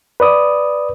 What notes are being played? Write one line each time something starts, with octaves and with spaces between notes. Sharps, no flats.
B4 D5 D#6